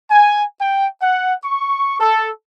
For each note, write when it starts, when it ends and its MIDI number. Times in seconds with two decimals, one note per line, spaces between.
0.10 0.42 80
0.60 0.86 79
1.01 1.34 78
1.43 1.96 85
1.99 2.28 69